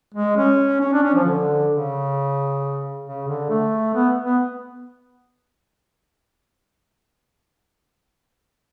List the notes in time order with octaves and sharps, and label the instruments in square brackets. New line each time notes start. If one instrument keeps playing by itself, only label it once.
[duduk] G#3
C#4
C#4
D4
C#4
F3
D3
C#3
C#3
D3
A3
B3
B3